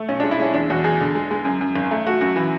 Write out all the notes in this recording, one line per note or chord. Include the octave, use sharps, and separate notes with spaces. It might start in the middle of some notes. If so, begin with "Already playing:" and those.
Already playing: A3
B1 C#4
G#3 D4
E4
G#3 C#4
E2 D4
E2 F#4
E2 G#4
D3
G#3
G#3
F#2
F#2
G#1
A3
A3 F#4
F#2 F#4
E3